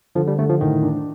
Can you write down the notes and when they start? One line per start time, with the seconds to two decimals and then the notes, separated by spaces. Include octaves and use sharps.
0.15 D3 F3
0.28 G3
0.39 D3 A3
0.49 F3
0.61 A2 D#3
0.83 D4